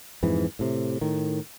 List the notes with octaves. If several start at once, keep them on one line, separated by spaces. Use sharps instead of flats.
F2 G#2 E3
A2 C3
A2 D#3